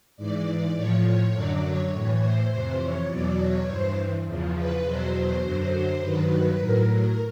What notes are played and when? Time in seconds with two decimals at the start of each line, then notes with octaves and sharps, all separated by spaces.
0.17 G#2 E3 D5
0.75 A2 F3 C#5
1.33 F#2 D3 F#3 D5
1.63 C#5
1.92 A2
1.97 E3
2.21 C5
2.50 F2 C3 E3
2.80 C#5
3.09 E2 B2 F#3 D5
3.38 C#5
3.67 G2 E3 C5
4.26 E2 C#3 F3
4.55 B4
4.84 E2 B2 F#3 C5
5.42 F#2 D3 F#3 C5
6.01 G2 D#3 F#3 B4
6.59 A2 F#3 A#4
6.89 A#4